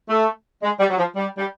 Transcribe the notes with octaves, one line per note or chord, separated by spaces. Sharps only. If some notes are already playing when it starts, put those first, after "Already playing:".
A3
G#3
G3
F#3
F3
G3
G3